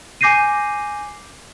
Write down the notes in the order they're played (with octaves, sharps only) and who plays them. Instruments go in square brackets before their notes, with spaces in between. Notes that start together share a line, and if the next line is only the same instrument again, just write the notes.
[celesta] G#5 D6 G6 A#6 C7 D#7